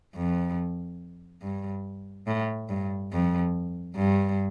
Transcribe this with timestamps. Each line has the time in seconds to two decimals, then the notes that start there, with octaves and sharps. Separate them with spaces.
0.16 F2
1.42 G2
2.27 A2
2.69 G2
3.12 F2
3.97 G2